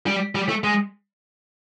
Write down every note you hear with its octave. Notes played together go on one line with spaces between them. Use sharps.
G3
G3
A3
G#3